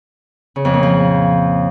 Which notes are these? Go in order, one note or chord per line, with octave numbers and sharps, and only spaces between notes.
C#3
F2
A#2
F3